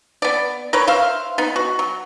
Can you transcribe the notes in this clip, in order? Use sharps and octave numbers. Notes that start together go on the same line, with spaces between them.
B3 D5
A#4 B4 C#5
C5 E5 F5
B3 D#4
F#4
F#3